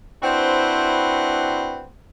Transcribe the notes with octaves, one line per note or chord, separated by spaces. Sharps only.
C4 D4 E4 F#4 B4 C5